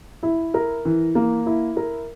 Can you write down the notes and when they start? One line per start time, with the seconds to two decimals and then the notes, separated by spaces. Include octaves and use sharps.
0.23 E4
0.54 A#4
0.85 E3
1.15 A#3
1.46 E4
1.77 A#4